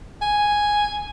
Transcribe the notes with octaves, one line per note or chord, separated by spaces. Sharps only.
G#5